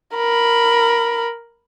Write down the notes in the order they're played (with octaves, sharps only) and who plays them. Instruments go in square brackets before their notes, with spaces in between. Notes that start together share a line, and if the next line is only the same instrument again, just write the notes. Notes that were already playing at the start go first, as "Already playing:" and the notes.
[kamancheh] A#4 B5